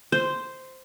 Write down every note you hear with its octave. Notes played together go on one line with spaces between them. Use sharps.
C5